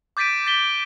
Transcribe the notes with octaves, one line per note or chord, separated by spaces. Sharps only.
D6 G6 A6 B6 D7 D#7
A6 B6 G7